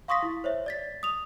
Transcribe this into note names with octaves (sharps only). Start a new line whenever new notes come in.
F5 C6 C#6 D#6 A#6 B6
E4
C5 C#5 E5
D5 A6 B6
D#6 F7